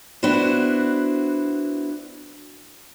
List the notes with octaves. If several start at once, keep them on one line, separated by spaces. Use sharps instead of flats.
B3 D4 E4 F#4 C5